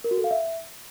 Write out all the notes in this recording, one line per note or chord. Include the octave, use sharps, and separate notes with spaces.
A#4
F#4
A4
F5
E5